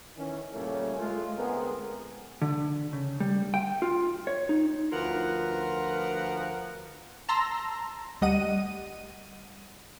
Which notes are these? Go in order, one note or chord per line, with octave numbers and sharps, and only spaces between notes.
D#3 E3 C#4
A#2 C#3 G3 A3 A#3 C#4
G#3 A3 F4
D2 G#3 B3 C4 G#4 A#4
D3
C#3
G3
G5
F4
C#5
D#4
D2 F3 F4 A#4 B4 F#5
A5 A#5 C6 E6 A#6
D2 G3 D#5 F#5 D#7